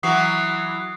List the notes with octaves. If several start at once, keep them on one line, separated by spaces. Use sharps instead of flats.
E3 F#3 F#4 D#6 C7